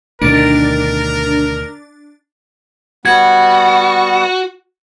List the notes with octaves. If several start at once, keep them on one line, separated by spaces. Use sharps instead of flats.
D2 B2 D#3 D4 A#4 A6
G3 B3 F#4 G#6